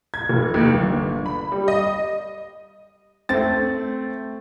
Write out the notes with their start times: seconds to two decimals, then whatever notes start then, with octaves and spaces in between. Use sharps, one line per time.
0.14 G#6
0.29 F1
0.54 D#2
0.74 G1
1.26 B5
1.52 G3
1.68 D#5
3.29 A3 C4 A6